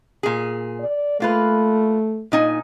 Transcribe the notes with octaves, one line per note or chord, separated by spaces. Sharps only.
A#2 G#4
D5
A3 A#3 F4 B4
A#2 D#4 G#5